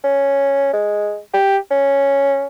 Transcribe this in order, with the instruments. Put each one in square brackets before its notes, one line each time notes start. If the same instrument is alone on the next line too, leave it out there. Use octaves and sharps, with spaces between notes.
[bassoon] C#4
G#3
G4
C#4